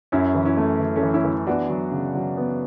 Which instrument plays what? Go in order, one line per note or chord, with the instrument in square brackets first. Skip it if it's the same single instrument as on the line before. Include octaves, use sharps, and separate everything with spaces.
[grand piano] F#2 [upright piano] C#4 E4
[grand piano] E3
[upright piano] C#4 E4
[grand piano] A3
E3
[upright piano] A3 C#4
[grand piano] E3
[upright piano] C#4 E4
[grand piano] E3
[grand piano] B3 [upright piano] D4 F#4
[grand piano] F#3
C#3
F#3
B3